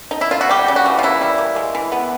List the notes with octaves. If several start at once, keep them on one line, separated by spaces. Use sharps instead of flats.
D#4
E4
F4
F#4
G3 G4
C#3
F#4
E3
F4
A#3 E4
G3
A#3
G#3
E3
B3